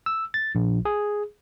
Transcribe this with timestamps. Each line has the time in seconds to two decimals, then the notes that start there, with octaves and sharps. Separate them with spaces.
0.06 E6
0.34 A6
0.55 A#1
0.85 G#4